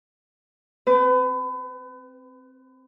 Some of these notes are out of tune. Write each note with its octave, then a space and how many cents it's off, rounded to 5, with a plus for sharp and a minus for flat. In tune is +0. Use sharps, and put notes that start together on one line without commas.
C4 +0 B4 +35